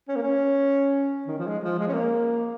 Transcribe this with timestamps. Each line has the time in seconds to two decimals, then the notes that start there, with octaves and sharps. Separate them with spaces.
0.08 C#4
0.16 A#3
0.22 C#4
1.27 D#3
1.38 F3
1.47 G#3
1.63 F3
1.79 G#3
1.88 C#4
1.93 A#3